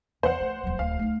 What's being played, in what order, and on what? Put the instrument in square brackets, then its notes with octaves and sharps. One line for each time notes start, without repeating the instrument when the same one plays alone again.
[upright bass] E2 F3 [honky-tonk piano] C5 F#5
[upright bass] A3
D#1 F#3
[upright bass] D1 [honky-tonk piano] F5
[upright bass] A3 D#4